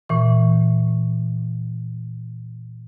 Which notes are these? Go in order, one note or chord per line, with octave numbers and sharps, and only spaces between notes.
A#2 E3 C#6